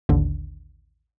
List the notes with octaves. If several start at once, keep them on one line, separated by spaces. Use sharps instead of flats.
A1 D#2 D3